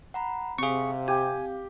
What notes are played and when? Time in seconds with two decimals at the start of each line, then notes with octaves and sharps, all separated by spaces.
0.14 F#5 A#5 B5
0.58 C3 C4 G#4 F5 C#6
1.08 G4 G#5